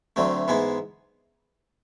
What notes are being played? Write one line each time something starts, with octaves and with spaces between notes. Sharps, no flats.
D2 D3 F#3 A3 C4
G#2 E3 G#3 B3